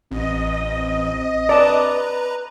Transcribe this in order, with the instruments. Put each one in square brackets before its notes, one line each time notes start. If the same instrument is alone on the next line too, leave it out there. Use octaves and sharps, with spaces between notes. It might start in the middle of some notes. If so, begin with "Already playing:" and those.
[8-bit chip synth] A1 [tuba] C4 [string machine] D#5
[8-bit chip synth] B4 A#5 [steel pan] D5 A5